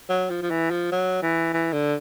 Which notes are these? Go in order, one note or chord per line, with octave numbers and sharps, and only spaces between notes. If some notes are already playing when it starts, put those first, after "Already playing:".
F#3
F3
F3
E3
F3
F#3
E3
E3
D3